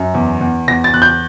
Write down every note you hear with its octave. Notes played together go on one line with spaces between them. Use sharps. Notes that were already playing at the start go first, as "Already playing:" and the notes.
Already playing: F#2
E2
E2
E2 A#6
A6
E2 F#6
G6